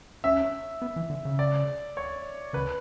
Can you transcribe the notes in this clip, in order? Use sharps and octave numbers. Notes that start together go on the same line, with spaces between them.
C#4 E5
B3
E3
D3
C#3
D5
C#5
C#3 B4